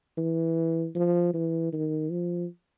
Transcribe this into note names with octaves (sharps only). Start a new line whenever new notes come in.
E3
F3
E3
D#3
F3